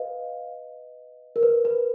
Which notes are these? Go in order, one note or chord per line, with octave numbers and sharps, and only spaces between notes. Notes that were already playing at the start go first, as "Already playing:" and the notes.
Already playing: B4 D#5 F5
A#4
B4
B4